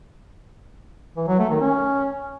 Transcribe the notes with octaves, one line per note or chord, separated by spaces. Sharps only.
E3
F#3
A3
D#3
C#4